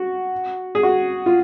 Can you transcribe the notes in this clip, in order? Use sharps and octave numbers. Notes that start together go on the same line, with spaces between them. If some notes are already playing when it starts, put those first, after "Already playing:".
Already playing: F#4
G#4
F#4
F4